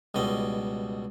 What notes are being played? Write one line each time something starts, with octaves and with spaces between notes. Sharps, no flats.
C#2 B2 G3 D#5